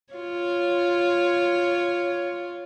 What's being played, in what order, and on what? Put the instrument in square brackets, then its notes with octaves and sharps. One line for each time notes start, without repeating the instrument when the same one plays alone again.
[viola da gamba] F4 C#5